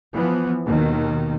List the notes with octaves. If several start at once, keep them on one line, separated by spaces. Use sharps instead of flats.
E3 F3 B3
D#2 B2 D#3